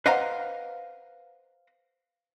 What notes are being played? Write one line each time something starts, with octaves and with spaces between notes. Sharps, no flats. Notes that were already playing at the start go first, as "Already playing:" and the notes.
B4 C5 D#5 F5 F#5 A#5